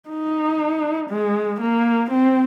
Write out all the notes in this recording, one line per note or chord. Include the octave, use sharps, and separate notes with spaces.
D#4
G#3
A#3
C4